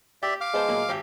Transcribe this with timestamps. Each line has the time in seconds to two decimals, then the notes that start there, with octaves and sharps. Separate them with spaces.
0.23 G4 D5 E5
0.41 F5 D6 F6
0.54 G#3 B3 C5 A5
0.68 A#2 F#3 A#3
0.89 G#1 G4